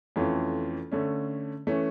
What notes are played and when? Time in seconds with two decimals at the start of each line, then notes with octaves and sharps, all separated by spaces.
0.16 F2 E3 A3 C#4 F4
0.92 D3 A3 C#4
1.67 E3 A3 C#4